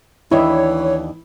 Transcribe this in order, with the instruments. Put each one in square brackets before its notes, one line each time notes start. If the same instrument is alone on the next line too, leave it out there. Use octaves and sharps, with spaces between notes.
[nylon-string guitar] D#2 D4 [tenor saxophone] E3 [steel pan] E4 D#5 [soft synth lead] C#5